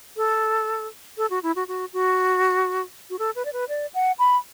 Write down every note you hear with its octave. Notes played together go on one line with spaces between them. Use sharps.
A4
A4
F#4
E4
F#4
F#4
F#4
F#4
A4
B4
D5
B4
D5
F#5
B5